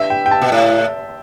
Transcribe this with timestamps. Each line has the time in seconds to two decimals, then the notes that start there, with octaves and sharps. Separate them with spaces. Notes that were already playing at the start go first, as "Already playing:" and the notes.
Already playing: G2 E5
0.10 G5
0.26 G5
0.31 A5
0.42 B2
0.52 A2